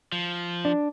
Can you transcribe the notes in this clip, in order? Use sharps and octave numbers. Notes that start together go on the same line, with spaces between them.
F3
D4